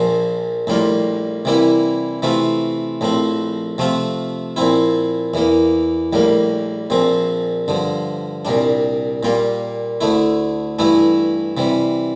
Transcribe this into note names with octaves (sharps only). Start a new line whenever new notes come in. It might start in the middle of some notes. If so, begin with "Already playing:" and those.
Already playing: A#1 A#2 F3
A#1 A2 G3 A#3 F4
C3 E3 G3 A#3 E4
C3 E3 A3 C4 F4
A#1 A2 F3 C4
C3 F3 A3 C4 F4
A#2 F3 C4 E4
E2 E3 A#3
A#1 A2 G3 A#3
A#1 A#2 F3 C4
G2 D3 F3
C2 A#2 G3 D4
A#2 G3 A#3 F4
D2 D3 A3 E4
G2 E3 A3 E4
C3 E3 G3